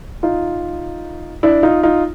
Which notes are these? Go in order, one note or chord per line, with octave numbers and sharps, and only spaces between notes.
D#4 F4
D4 E4
D#4 F4
D#4 F4